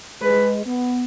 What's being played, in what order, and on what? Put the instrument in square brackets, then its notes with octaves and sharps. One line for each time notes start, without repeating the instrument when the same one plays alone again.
[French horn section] G#3 [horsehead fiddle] B4
[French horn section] B3